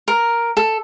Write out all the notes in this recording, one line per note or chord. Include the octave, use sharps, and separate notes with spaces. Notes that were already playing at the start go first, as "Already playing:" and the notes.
A#4
A4